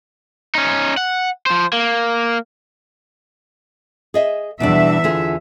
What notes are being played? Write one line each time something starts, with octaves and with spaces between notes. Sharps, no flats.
C#4 D#4
F#5
F3 C5
A#3
G#4 D#5 E5
E2 B2 G3 D4 E5
D3 F4 G#4